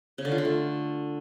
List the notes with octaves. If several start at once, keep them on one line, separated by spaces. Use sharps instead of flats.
C#3
D3
F4
D3
A3